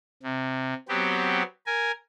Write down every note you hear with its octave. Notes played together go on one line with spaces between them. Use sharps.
C3
F#3 B3 C4 G4
A#4 G#5